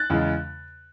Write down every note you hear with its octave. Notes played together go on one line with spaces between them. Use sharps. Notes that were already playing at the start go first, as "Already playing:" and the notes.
Already playing: F#6 A6
E2 C#3 G#3